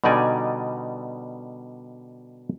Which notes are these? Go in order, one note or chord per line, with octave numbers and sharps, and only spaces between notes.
B2 D3 G3 D#4 D5 G#5